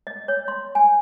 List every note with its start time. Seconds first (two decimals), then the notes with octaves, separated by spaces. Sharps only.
0.07 D#5
0.28 C#5
0.48 C6
0.75 G#5